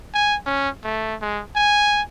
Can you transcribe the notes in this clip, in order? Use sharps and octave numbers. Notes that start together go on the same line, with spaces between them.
G#5
C#4
A3
G#3
G#5